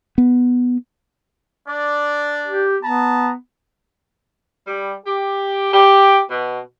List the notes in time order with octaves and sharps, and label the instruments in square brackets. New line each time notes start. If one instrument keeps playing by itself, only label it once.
[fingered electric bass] B3
[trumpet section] D4 D5
[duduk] G4
[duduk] B3 [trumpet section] A5 A#5
[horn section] G3
G4
G4
B2